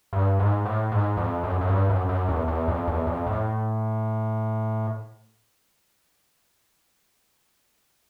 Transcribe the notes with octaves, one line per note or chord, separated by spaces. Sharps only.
G2
G#2
A2
G#2
F2
F#2
F#2
G2
F#2
F#2
E2
E2
F2
E2
F2
A2